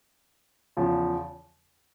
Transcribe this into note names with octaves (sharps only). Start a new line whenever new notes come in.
E2 C#3 F3